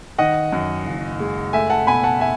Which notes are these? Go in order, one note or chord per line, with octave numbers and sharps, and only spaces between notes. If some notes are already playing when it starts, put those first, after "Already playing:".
D#3 D#5 F#5
F#2
F#1
G#3
A3 E5 G#5
F#5 A5
B2 G#5 B5
F#5 A5
E5 G#5